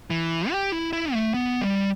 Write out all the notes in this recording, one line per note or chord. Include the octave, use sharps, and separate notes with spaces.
E3
G4
E4
E4
A3
B3
G3